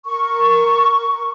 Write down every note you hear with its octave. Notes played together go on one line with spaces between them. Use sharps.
A#4 C#6